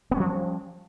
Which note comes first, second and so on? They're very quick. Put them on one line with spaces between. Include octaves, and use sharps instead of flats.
B3 C#4 G3 F3